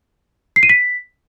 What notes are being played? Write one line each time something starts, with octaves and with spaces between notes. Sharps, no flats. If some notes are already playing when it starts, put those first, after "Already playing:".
C7
D#7
B6